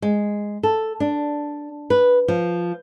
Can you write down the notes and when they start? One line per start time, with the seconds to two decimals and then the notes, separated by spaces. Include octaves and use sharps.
0.02 G#3
0.63 A4
1.00 D4
1.90 B4
2.28 F3